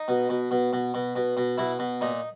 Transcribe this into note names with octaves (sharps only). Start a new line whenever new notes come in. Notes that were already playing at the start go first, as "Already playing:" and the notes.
Already playing: D#4
B2
B2
B2
B2
B2
B2
B2
B2 E4
B2
A#2 D#4